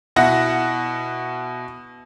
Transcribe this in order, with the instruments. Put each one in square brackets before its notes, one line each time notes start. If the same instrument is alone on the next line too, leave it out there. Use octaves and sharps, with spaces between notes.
[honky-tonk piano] B2 E4 F#5 A#6